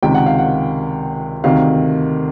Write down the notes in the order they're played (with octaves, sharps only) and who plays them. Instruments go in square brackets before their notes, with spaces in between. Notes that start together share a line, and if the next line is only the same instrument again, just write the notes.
[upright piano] C#2 C3 D#3 G5
F#5
F5
F#5
D2 C3 D#3 F5